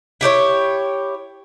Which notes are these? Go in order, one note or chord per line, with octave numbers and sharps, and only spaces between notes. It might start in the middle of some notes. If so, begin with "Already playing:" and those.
E4 G4 C5 C#5